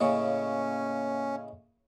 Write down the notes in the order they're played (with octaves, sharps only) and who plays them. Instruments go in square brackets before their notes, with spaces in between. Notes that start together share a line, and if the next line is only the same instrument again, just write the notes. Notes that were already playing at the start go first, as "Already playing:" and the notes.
[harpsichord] A2 C#3 C#6 [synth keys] A#3 [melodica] C#4 [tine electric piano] D#5 F5 G#5